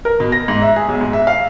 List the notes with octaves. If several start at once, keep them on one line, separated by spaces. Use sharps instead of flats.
A#4
B2
A#6
G#2
E5
G#4
B1
G#2
E5
F5